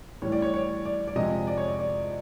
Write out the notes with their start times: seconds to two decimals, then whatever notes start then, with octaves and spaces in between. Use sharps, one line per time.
0.22 A2 E3 G3 C#5
0.32 D5
0.42 C#5
0.54 C#5
0.86 D5
1.08 D5
1.16 F2 C3 F3 G#3 D#5
1.47 D5
1.58 C#5
1.68 D5
1.79 D5